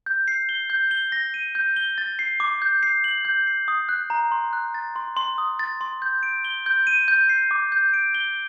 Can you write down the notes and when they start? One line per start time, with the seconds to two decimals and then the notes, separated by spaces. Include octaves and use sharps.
0.06 G6
0.28 C7
0.49 G7
0.70 G6
0.91 G7
1.12 A#6
1.34 D#7
1.55 G6
1.76 G7
1.98 A6
2.19 C7
2.40 D6
2.62 G6
2.83 C7
3.04 F#7
3.25 G6
3.47 C7
3.68 D#6
3.89 F#6
4.10 A#5
4.32 C6
4.53 F#6
4.74 A6
4.96 C6
5.17 C6
5.38 D#6
5.59 A6
5.81 C6
6.02 G6
6.23 D7
6.45 G7
6.66 G6
6.87 D#7
7.08 G6
7.29 C7
7.51 D6
7.72 G6
7.93 D7
8.15 G7